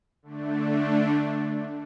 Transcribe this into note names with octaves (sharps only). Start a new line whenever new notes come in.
D3 A3 D4